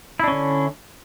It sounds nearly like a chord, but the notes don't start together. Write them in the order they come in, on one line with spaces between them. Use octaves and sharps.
E4 D4 C#4 D3